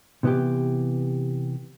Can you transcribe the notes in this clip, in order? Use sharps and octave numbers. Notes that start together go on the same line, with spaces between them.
C3 E3 B3 E4 G4